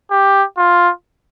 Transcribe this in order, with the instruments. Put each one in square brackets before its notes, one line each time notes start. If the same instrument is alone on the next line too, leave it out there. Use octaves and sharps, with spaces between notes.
[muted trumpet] G4
F4